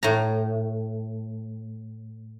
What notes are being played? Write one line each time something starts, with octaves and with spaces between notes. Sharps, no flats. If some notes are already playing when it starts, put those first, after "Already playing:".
A2 A#5